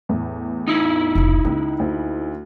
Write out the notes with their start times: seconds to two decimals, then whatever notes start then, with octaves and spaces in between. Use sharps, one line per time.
0.09 E2 A2
0.68 D#4 E4
1.15 F1 C#2
1.45 C#2 A#3
1.79 D2